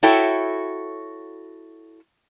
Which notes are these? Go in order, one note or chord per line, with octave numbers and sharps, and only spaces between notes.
E4 F#4 A4 C#5 E5 G5